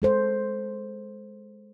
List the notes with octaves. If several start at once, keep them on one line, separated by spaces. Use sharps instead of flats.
G#3 A4 C5